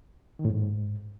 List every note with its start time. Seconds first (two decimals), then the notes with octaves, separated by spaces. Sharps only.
0.39 D#3
0.45 A2
0.50 G#2